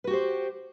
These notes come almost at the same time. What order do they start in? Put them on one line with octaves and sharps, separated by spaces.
B4 F#4 G4 C5